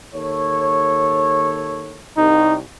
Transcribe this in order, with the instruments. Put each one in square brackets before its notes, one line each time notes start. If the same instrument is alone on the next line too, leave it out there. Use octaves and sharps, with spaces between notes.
[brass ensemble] D#2 A4 C#5
[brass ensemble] C2 [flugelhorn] D#4